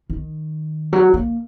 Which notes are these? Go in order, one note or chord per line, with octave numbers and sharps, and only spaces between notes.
D#3
F#3
A#3